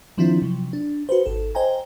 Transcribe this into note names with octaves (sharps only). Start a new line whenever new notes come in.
D#3 F3 C4 D4 E4 F4
C3 F3 F#3
D4
F#4 B4 C5
G#1 A4
C5 D#5 G5 G#5 A#5